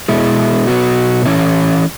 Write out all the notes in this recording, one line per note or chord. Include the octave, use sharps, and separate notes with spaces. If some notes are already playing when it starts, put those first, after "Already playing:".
B2 G#3 E4
B2 F#3 B3 F#4
E3 C#4 E4